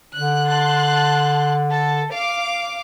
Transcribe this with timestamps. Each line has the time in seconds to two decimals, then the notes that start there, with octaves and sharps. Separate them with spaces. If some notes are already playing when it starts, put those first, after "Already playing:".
0.15 D3 F#6
0.48 A5 C6 F#6
1.71 A4
2.13 F5 D6